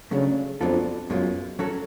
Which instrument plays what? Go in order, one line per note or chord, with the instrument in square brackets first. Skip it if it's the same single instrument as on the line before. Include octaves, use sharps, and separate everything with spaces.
[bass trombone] C#3 [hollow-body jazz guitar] F#3 A3 D4
[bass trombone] F2 [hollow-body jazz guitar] F#3 B3 D4 F4 A4
[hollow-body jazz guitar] B1 B2 G#3 C#4 F4 [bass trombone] F#2
[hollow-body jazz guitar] F#3 C#4 F#4 A4 C#5